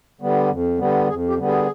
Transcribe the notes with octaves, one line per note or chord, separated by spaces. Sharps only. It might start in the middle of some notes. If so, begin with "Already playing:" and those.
D3 G3 B3
F2
D3 G3 B3
F2 G#4
G4
D3 G3 B3
G#4